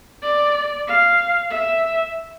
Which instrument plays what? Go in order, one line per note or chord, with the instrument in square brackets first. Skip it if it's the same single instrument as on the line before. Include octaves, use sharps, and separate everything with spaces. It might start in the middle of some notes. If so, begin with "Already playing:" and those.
[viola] D5
F5
E5